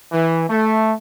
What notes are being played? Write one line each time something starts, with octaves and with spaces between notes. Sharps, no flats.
E3
A3